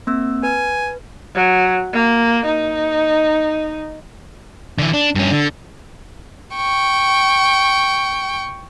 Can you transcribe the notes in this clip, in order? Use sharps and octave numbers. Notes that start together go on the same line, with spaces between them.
A#3 C4 E6
B4 G#5
F#3
A#3
D#4
D3 E3
D4
G2 C#4
D3
G5 C#6